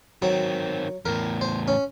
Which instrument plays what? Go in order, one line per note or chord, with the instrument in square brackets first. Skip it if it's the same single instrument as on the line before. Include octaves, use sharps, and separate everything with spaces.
[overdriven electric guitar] D#3 C4 [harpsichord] F#3
[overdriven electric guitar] E2 A2 [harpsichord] A#4
[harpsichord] C5
C#4